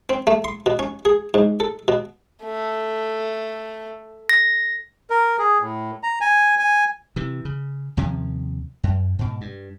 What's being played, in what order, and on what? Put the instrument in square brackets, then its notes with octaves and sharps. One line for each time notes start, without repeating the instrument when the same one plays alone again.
[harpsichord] C4
A3
C6
B2
C#4
G#4
G#2
A4
B2
[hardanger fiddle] A3
[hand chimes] A#6
[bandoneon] A#4
G#4
A2
A#5
G#5
G#5
[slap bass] C3 E3
C#3
D#2 C3 F3 C#4
F#2
G#2 B2
G2